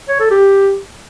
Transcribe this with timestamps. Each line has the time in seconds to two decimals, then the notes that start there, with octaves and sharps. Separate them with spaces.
0.09 C#5
0.20 A4
0.31 G4